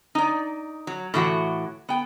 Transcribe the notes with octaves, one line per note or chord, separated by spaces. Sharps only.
D#4 D5
F#3
A2 E3 F#4 F#5
B3 G5